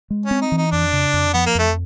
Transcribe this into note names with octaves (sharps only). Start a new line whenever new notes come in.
G#3
C#4
C4
D#4
E3
D#4
F2 D4
C#3
F2
F3 B3
A#3
F2 A3